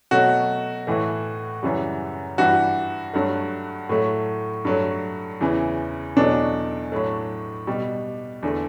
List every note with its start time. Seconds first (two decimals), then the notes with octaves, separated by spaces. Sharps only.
0.11 B2 F#3 A3 F#4
0.87 A2 E3 A3
1.63 F#2 C#3 E3 G3
2.38 G2 E3 G3 F#4
3.14 G2 F#3 A3
3.89 A2 F#3 A3
4.65 G2 F#3 A3
5.41 E2 C#3 E3
6.16 E2 B2 F#3 A3 D4
6.92 A2 F#3 A3
7.67 B2 G3
8.43 E2 D3 A3